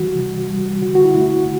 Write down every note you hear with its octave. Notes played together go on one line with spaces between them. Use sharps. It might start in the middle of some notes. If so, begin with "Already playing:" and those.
Already playing: E3 G3 F#4
C3
G3
D3 F#4
F#4
E4
A3
F#4